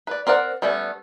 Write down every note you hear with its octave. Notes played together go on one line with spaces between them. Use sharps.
B4 D5
C4 A#4 D5 F#5
G3 A3 B3 C#4